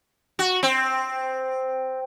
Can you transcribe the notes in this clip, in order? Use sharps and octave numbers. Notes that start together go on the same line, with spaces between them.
F#4
C4